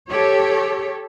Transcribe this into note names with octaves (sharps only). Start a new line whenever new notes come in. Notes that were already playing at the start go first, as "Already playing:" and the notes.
G4 A4 C#5